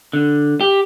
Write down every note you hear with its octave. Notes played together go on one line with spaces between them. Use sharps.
D3
G4